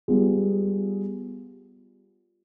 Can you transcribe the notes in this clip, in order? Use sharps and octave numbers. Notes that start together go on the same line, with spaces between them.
G3 B3 F4 G#4